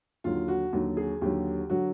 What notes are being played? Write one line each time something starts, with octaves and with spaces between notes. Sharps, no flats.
D#2 D3 F#3 F4
F#4
D#2 D3 F#3
G#4
D#2 D3 F#3 G4
D3 F#3 F#4